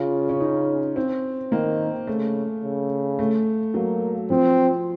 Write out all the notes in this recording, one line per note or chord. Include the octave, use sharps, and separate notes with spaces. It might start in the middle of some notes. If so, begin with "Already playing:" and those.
Already playing: C#3 F4
C#4
D#4
C4
D#3 A#3
C#3 A3
C#3
A3
F#3 A#3
F3 C4